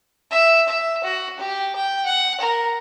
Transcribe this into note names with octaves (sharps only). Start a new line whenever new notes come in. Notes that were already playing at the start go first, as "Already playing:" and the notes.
E5
E5
F#4
G4
G5
F#5
A#4